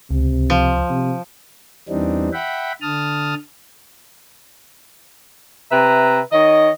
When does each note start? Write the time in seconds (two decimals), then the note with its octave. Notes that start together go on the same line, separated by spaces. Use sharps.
0.11 C#2 C3
0.50 F3
0.89 C3
1.89 E2 E3 G3 C4 D4 D#4
2.33 E5 F#5 G5 B5
2.81 D3 A5 D#6 F6
5.71 C3 B4 E5 A#5
6.33 D#3 C#5 D#5